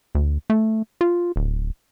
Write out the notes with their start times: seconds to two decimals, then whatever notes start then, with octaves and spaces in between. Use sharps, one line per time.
0.15 D2
0.50 A3
1.01 F4
1.36 D1